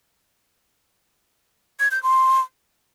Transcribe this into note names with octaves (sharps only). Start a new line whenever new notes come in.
G#6
G6
C6